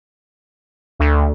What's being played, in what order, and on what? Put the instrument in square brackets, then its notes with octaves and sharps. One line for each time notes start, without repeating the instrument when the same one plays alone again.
[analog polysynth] D2